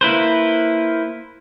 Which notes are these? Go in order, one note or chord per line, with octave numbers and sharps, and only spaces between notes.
A#3 E4 B4 C5